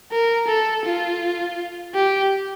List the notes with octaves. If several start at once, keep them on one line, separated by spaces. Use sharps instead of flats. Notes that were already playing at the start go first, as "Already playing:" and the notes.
A#4
A4
F4
G4